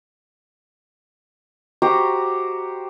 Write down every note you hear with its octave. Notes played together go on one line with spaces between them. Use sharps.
F#4 G4 C5 A#5